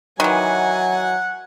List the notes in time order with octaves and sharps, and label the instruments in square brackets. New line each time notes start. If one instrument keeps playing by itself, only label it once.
[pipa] D#3 E3 [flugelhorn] F#3 [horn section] F#5 [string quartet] G#5